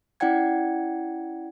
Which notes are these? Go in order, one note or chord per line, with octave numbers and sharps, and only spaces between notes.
C#4 E4 D5 F#5 G5 G#6